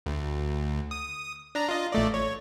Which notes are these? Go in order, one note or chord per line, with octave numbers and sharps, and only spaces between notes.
D2
D#6
D4 A#5
F4 D#5
A1 A3 D5
C#5